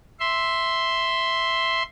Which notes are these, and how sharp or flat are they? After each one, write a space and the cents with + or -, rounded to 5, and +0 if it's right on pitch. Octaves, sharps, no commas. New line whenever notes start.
E5 +0 C6 +0